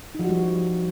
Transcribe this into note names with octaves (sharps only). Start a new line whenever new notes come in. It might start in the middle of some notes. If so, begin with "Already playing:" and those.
F3 G3 D#4 F#4